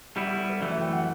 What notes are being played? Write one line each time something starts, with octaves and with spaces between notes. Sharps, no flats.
G3 B3 E4 G4
G4
A4
B4
F#2 E3 A3 D5
E5
G5
F#5